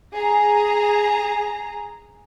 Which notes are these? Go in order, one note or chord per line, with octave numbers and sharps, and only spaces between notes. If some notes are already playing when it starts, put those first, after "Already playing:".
G#4 A#5